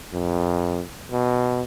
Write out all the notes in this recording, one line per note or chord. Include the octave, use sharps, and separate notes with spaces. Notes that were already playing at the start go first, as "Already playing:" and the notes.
F2
B2